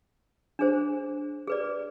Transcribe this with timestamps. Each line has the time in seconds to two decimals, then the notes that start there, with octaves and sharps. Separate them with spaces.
0.59 D4 G#4 C5
1.47 G#4 B4 D5